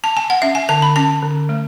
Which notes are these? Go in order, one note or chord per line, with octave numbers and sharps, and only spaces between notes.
A5
G#5
F#5
C#4 E5
G#5
D3 A5
B5
C#4 A5
D3
A3